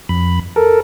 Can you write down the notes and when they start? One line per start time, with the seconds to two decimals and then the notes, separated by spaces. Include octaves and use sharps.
0.09 F2 B5
0.56 A4 A#4